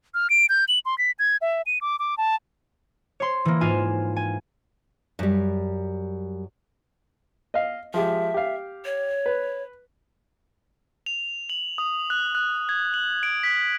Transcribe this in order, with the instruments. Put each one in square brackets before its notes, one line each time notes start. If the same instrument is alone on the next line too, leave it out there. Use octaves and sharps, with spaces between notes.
[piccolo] F6
D7
G6
F#7
C6
B6
G#6
E5
D#7
D6
D6
A5
[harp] C#5 C6
E3 A#3
G#2 F4 F5 G#5 E7
G#5
[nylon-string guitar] F#2 G3
[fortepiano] D#5 F5
[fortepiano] F3 G#3 G4 [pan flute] E5
[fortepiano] G4 F5
[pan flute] C#5
[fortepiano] B4
[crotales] F7
F#7
D#6
F#6
F#6
G#6
F#7
D7
B6